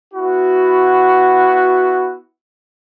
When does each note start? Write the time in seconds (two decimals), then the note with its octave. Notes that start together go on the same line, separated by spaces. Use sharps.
0.13 B3 E4 F#4